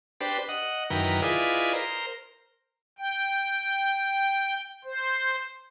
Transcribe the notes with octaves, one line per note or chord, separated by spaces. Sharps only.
D4 G4 B4 C5
D#5 F#5
F#2 D#3 E3 A#4 B4 G5
E4 F4 G#4 B4 D5 D#5
A#4 C5
G5
C5